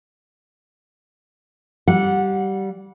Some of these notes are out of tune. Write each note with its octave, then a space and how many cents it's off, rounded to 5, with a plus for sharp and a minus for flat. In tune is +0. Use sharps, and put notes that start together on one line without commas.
G3 -15 F#5 -20